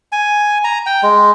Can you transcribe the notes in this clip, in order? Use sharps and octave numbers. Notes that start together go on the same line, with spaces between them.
G#5
A#5
G5
G#3